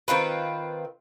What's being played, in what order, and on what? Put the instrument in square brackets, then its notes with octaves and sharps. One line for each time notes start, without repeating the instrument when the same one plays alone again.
[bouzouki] D#3 C4 F4 B4